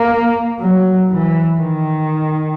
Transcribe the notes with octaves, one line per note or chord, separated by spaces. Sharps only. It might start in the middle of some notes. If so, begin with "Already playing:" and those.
Already playing: A#3
F#3
E3
D#3